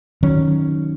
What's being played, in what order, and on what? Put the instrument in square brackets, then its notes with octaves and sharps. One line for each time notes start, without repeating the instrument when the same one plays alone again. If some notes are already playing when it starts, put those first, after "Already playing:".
[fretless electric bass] D#3 F#3 C#4